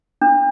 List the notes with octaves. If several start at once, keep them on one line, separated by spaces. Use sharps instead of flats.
D4